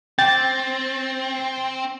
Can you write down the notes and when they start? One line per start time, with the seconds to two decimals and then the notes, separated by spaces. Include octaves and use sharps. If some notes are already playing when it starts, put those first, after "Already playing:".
0.19 C4 G5 A6